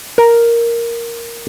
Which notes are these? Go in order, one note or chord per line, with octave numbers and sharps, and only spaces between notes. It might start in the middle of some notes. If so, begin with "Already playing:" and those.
A#4